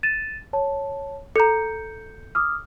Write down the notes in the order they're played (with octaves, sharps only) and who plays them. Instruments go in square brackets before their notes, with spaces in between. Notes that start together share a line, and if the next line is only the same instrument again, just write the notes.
[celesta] A6 D#7 E7
C#5 A5
[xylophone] A4 A#5 [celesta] G6 C#7
[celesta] D6 D#6 F6